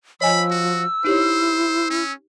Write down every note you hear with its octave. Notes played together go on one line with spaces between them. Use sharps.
F3 C#5 D#5 G#5 B5 E6
F#4
D#4 E4 G4 C5 C#5
C#4